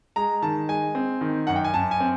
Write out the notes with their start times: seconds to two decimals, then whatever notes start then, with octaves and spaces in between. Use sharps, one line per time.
0.16 G#3 A#5
0.42 D#3 A5
0.69 G#3 G#5
0.95 C4
1.21 D#3
1.47 F#2 F#5
1.56 G5
1.64 G#5
1.74 F#2 A5
1.91 G#5
2.00 C4